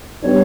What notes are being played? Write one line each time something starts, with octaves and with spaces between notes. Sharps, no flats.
G3 B3 D4 C#5